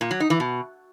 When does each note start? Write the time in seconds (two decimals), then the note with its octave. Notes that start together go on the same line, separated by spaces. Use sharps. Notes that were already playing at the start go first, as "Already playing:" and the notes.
0.01 A#2
0.11 F#3
0.20 D#4
0.30 E3
0.40 B2